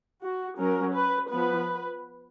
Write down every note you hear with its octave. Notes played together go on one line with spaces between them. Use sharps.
F#4
F#3 C#4 A#4
B4
F3 B3 B4